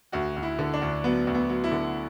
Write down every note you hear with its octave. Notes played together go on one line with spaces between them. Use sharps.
D2 F#4
D2
E4
D3
D4
D2
F#3 B3
D2
B3
F#3
E4
D3